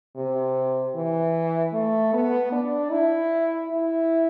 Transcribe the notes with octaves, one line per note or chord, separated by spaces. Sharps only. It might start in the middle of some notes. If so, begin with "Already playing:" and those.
C3
E3
A3
B3
D4
E4
E4